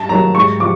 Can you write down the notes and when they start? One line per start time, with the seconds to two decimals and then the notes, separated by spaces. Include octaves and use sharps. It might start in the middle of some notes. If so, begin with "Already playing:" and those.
Already playing: G2 A5
0.09 D#3 F#3 A#3 A#5
0.35 G#2 C#6
0.60 F3 D6